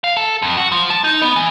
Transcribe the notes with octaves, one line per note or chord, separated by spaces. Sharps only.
F5
A4
F2
F#4
F3
A5
D#4
B3
E3